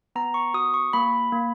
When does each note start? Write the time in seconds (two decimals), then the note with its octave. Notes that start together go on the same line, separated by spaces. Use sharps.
0.16 B3 A#5
0.34 C#6
0.54 F#4 D#6
0.74 C#6
0.93 A#3 B5
1.32 A#3